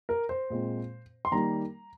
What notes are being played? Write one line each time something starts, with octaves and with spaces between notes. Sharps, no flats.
A#4
C5
A#2 G#3 C4
C6
D#3 G3 A#3 A#5